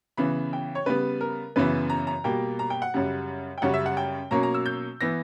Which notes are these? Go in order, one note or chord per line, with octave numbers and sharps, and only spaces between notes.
C#3 E3 B3 B5
G5
C#5
C#3 G3 B3 B4
A#4
F#2 C#3 E3 B3 B4
A#5
A#5
B2 G3 A#3 G5
A#5
G5
F#5
F#2 C#3 G3
G5
F#2 C#3 G3 C#4 F#5
E5
F#5
G5
B2 F#3 A#3 C#4 A#5
A#5
E6
G6
E3 B3 A#6